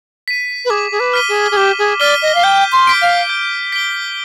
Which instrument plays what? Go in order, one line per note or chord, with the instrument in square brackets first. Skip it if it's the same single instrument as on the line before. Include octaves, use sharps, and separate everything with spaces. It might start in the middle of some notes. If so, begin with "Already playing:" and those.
[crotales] B6 D#7
[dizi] B4
[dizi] G#4 [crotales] D6
[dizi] G#4
B4
[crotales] F6 B6 D#7 G7
[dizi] G#4
G#4
[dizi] G4 [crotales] D6
[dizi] G#4
[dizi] D5 [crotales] F6 B6 D#7 G7
[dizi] D#5
F5
[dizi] G5 [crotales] G6
[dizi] C6
[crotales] B6 D7 G7
[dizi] F5
[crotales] G6
B6 D7 G7